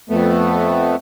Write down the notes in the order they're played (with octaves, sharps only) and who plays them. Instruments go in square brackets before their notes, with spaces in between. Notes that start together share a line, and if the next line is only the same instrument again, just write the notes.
[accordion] F2 A3 B3